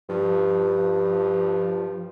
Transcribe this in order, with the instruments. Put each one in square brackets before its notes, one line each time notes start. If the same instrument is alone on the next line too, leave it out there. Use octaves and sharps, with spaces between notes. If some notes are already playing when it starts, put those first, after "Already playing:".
[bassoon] G2 [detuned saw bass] F3